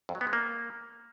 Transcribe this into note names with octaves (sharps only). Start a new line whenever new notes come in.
F2
F#3
B3
G#3
A#3